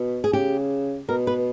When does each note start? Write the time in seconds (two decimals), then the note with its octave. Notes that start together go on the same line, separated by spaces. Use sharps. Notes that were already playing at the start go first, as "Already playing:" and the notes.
Already playing: B2
0.24 G#4
0.33 C#3 G4
1.09 B2 A#4
1.27 B4